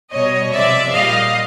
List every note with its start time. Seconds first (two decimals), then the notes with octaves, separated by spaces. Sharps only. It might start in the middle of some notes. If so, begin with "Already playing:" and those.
0.11 B2 G3 C#5 D#5
0.51 C3 F3 G#3 D5 E5
0.92 A#2 G3 D#5 F5